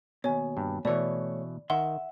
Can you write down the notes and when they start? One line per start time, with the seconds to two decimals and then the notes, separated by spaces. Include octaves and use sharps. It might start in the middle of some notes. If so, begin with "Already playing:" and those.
0.24 D#2 B2 C#5 G#5
0.57 G2
0.85 B2 E3 A3 C#5 D5
1.70 D#3 E5 F#5 C6